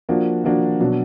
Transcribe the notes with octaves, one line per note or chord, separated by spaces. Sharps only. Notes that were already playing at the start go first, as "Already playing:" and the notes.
F3 A#3 D4 F#4
F3 A#3 D4 F#4
B2 F#3 D4